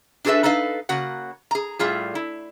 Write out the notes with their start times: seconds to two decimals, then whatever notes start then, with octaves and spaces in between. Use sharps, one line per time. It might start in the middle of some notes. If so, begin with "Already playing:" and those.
0.25 D4 F#4 G#4 A4 B4 E5
0.43 D#4 A4 B4 D#5 F5
0.89 C#3 A#3 F#4 F#5
1.51 G#4 A#5
1.79 A2 G3 F4 G#4
2.15 E4